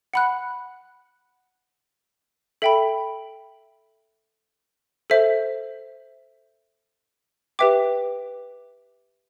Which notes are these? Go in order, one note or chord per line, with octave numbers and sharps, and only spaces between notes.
F#5 B5 F#6
A4 E5 G5 B5
A4 C5 E5
G4 B4 E5 G5 D6